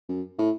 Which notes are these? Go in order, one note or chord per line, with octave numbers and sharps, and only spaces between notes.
F#2
A2